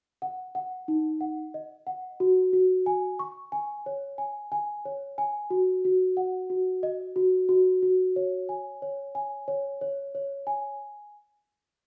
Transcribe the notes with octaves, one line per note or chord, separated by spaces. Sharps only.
F#5
F#5
D#4
F#5
D#5
F#5
F#4
F#4
G#5
C#6
G#5
C#5
G#5
G#5
C#5
G#5
F#4
F#4
F#5
F#4
D#5
F#4
F#4
F#4
C#5
G#5
C#5
G#5
C#5
C#5
C#5
G#5